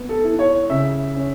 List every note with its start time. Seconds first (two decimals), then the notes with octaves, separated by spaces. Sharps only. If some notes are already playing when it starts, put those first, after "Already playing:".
Already playing: B3
0.09 A4
0.24 E4
0.39 C#5
0.70 C#3 E5
1.16 C#4